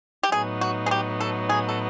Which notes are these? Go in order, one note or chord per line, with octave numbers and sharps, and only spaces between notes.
G4
A2 F#3 B3 D#4 G#4
F#4
G#4
G4
A4
G#4
A4